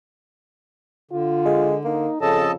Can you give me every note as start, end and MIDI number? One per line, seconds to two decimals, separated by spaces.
1.11 2.06 50
1.11 1.71 65
1.45 1.76 56
1.85 2.11 58
1.85 2.18 63
2.21 2.54 41
2.21 2.54 49
2.21 2.51 69
2.21 2.51 75
2.21 2.51 81